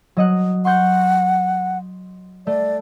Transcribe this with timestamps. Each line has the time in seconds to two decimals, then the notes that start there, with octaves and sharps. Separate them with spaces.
0.17 F#3 D#5 F#5
0.65 F#5 C6 C#6 G6
2.47 A3 D5